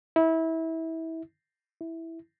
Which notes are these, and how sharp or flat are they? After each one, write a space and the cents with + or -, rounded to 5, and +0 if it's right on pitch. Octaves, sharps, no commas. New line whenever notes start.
E4 -25
E4 -5